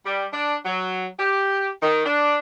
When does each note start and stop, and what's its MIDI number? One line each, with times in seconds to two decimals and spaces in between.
0.06 0.27 55
0.33 0.57 62
0.65 1.07 54
1.20 1.69 67
1.82 2.03 51
2.06 2.39 62